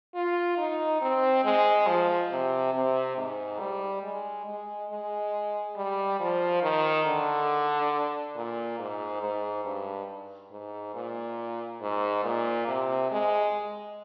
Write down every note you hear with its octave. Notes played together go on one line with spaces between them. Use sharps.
F4
D#4
C4
G#3
F3
C3
C3
G#2
G3
G#3
G#3
G#3
G3
F3
D#3
D3
A#2
G#2
G#2
G2
G#2
A#2
G#2
A#2
C3
G#3